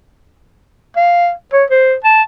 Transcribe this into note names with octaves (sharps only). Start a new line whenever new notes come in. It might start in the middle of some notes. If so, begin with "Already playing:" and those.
F5
C#5
C5
A5